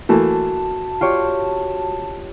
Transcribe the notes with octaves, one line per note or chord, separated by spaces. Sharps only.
E3 A3 A#3 F#4 A5
F4 G4 C#5